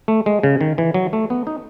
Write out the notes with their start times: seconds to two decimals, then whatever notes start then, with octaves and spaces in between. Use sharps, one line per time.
0.08 A3
0.26 G#3
0.43 C#3
0.61 D#3
0.78 E3
0.94 F#3
1.13 A3
1.30 B3
1.47 D#4